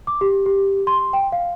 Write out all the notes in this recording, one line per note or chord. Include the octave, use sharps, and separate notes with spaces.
D6
G4
G4
C6
G5
F5